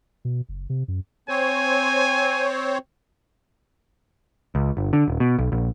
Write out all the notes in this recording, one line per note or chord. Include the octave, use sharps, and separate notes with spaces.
B2
F#1
C3
F#2
C4 C5 C#5 G#5
C#2
G1
D3
D#1
B2
B1
A#1